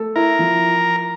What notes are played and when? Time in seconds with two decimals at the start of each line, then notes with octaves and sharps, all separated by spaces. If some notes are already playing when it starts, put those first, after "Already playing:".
Already playing: A3 A4
0.16 E4 A#4
0.39 F3